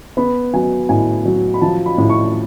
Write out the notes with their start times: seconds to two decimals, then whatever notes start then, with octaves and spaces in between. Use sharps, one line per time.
0.17 B3 B5
0.54 F#3 G#5
0.89 A2 G#5
1.25 F#3
1.54 B5
1.62 F3 A5
1.86 B5
1.98 A2
2.10 C#6